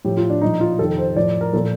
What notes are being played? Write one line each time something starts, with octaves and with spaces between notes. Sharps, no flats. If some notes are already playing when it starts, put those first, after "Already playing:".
A2 F3 G4
F4
D4
A#2 F3 D#4
F4
F2 C3 D#3 A4
C5
A2 F3 D5
A#4
A#2 F3 A4